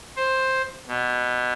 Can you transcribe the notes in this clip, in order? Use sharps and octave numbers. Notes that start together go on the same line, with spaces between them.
C5
B2